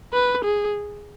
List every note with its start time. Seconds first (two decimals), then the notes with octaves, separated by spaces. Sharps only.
0.13 B4
0.45 G#4